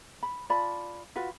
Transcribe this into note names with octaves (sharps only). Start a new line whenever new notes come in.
B5
F4 D5 A5 B5
F4 F#4 B4